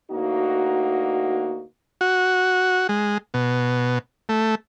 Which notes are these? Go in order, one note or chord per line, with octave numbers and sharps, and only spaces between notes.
D2 A#3 D#4 F#4
F#4
G#3
B2
A3